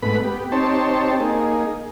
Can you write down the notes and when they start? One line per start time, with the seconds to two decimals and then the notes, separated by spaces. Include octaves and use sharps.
0.02 G#2 A3 B3 B4 B5
0.24 B3 G4
0.52 C4 D#4 G4 C5 C#5 A5
1.20 A#3 D#4 G#4